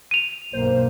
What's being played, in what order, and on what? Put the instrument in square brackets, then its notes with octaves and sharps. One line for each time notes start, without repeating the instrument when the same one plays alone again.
[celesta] D#7 F7
[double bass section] B1 G2 [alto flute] A#3 [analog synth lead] C5